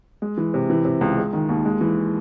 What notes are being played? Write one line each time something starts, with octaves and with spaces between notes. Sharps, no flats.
G#3
E3
C3
E3
C3
C#2
G#3
D#3
D#2
G#3
E3